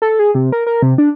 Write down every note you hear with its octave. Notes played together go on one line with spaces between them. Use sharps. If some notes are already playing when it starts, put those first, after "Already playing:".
A4
G#4
C3
A#4
A#4
C3
D4